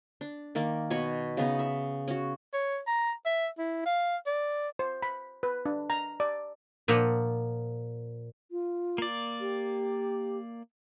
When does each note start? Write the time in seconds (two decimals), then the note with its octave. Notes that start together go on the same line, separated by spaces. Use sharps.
0.21 D4
0.55 D#3 A#3 D5
0.90 B2 C#5 G#5 B5
1.37 C#3 B3 D#4
1.59 E5
2.08 C#4 F#4
2.54 C#5
2.87 A#5
3.26 E5
3.59 E4
3.86 F5
4.26 D5
4.79 C5
5.02 B5
5.43 B4
5.66 D4
5.90 A#5
6.20 D5
6.88 A#2 F3 F#5
8.51 F4
8.98 A#3 D5
9.40 G4